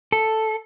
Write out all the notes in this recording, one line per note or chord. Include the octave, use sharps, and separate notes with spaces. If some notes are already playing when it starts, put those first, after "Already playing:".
A4